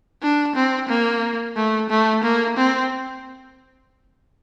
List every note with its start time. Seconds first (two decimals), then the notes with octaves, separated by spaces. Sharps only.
0.22 D4
0.56 C4
0.89 A#3
1.56 A3
1.90 A3
2.24 A#3
2.57 C4